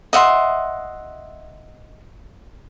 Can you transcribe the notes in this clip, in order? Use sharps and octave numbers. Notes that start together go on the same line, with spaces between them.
D#5 E5 F#5 C6